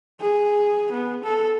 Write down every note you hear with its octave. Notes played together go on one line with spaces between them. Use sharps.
G#4
B3
A4